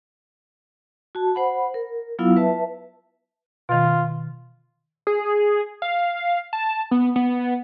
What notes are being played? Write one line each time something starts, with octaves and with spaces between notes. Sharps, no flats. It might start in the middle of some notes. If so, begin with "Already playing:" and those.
F#4 A5
C5 F#5 B5
A#4
F#3 B3 E4 F4 F5 E6
B4 E5 A5
B2 D#3 F4
G#4
F5
A5
B3
B3